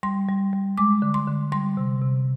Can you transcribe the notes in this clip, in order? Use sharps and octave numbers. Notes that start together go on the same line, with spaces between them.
G3 C6
G3
G3
G#3 D6
D3
C6
D3
G3 C6
C3
C3